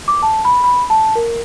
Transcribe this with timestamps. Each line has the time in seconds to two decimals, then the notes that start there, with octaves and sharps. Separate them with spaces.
0.08 D6
0.23 A5
0.45 B5
0.64 B5
0.90 A5
1.15 A#4